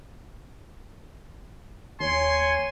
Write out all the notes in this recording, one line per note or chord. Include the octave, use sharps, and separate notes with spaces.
D#2 C#5 G#5 C6